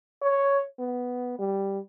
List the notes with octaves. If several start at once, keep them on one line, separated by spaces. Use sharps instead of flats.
C#5
B3
G3